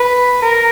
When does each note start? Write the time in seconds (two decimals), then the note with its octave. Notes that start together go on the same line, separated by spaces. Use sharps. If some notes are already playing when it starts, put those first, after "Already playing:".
Already playing: B4
0.42 A#4